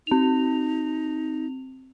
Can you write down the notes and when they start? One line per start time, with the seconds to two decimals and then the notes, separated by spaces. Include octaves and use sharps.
0.07 C4 D#4 F7